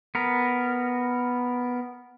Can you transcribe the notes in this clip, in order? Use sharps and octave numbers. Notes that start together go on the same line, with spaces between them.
B3 A#4